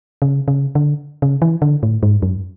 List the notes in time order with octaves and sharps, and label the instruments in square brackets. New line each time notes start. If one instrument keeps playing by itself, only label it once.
[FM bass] C#3
C#3
D3
C#3
E3
D3
A2
G#2
F#2